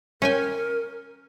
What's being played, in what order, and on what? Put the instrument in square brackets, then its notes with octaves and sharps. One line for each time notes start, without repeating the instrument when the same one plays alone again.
[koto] C#4 G5 G#5 [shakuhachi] A#4